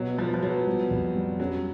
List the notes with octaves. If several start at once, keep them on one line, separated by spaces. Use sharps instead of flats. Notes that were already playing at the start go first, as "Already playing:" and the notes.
Already playing: B2 F#3
F3 B3
F3
F#3 B3
G3
F2
G3
F#3 C#4